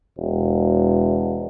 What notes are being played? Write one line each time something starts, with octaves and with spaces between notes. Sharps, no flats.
E1